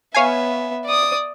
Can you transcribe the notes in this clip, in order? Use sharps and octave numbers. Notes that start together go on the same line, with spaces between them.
B3 C#5 E5 F5 G#5
D5 D#6